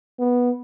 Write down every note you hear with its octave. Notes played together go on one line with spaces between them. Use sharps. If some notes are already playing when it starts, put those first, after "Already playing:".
B3